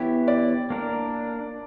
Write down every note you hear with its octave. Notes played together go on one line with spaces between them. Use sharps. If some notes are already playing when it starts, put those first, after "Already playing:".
Already playing: E3 B3 E4 G4 C#5
D5
A#3 D4 A#4